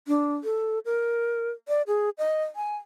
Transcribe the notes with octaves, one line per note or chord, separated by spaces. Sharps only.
D4
A4
A#4
D5
G#4
D#5
G#5